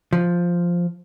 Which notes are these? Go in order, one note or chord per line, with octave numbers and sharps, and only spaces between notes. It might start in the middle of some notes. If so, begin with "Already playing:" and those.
F3